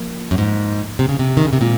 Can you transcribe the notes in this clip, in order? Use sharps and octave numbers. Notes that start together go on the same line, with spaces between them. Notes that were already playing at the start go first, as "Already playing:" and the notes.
Already playing: F3 A#3
F#2
G#2
C3
C#3
C3
D#3
C#3
C3
A#2 G#3 C4 F4